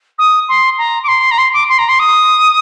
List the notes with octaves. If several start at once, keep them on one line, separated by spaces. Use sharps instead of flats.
D#6
C6
A#5
D6
C6
A#5
C6
D6
C6
A#5
C6
D#6